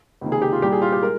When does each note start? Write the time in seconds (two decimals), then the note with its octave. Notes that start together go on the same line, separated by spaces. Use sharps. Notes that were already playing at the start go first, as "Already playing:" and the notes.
0.21 C#2 C3 D#3 A#3
0.32 G#4
0.42 G4
0.52 F4
0.62 C2 A#2 G3 G4
0.72 G#4
0.82 F4
0.92 G4
1.02 G#3 A#4